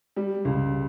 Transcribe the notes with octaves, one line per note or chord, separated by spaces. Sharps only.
G3
C#2